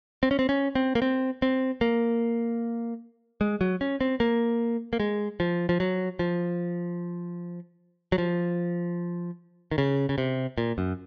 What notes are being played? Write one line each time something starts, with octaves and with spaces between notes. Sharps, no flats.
C4
C#4
C4
C#4
C4
A#3
C4
C4
A#3
G#3
F#3
C#4
C4
A#3
A#3
G#3
F3
F3
F#3
F3
F#3
F3
D#3
C#3
C#3
C3
A#2
F#2